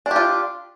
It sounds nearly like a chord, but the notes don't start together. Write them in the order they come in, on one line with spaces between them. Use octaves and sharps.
D4 G4 F4